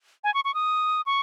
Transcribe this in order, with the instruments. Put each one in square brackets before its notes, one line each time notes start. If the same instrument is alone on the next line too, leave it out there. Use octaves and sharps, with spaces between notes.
[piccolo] G#5
C#6
C#6
D#6
C#6